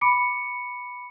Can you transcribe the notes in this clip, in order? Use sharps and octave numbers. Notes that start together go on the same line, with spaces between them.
B5 D6 C#7 D7